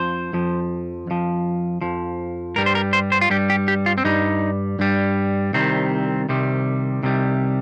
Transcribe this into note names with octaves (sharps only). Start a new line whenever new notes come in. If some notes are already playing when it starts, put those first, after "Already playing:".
Already playing: F2 F3 C5
F2 F3
F2 F3
F2 F3
G2 G3 A#4
C5
A#4
C5
C5
F4
G2 G3 G4
G4
G4
F4
C4
G2 G3 D#4
G2 G3
C2 C3 D#3 G3 C4
C2 C3 D#3 G3
C2 C3 D#3 G3